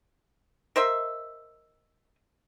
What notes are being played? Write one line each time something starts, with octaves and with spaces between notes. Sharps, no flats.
A#4 C5 D#5 E5